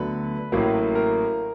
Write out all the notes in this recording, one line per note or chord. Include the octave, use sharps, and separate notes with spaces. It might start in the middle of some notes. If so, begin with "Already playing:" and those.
Already playing: D2 D3 F#3 B3 B4
A1 A2 F#3 A#3
A#4